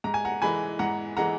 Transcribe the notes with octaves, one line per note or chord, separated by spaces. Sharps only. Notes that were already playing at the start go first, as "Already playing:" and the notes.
G#2 A#5
G#5
F#5 A#5
E3 G#3 G#5 B5
G#2 F#5 A#5
E3 G#3 F#5 A#5